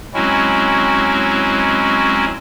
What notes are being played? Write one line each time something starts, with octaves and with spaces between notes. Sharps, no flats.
F#3 G#3 C4 C#4 E4 F#4